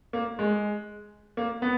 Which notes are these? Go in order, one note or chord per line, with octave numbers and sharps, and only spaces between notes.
A#3
G#3
A#3
B3